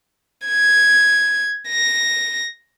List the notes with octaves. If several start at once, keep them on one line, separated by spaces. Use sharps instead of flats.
G#6
A#6